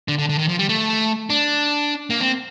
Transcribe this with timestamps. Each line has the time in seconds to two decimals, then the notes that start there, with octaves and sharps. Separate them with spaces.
0.08 D3
0.18 D3
0.29 D3
0.38 D#3
0.49 F3
0.59 G3
0.69 A3
1.30 D4
2.10 A#3
2.20 C4